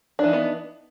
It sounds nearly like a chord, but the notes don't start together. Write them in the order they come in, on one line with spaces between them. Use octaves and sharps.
D4 E3 D#4 B3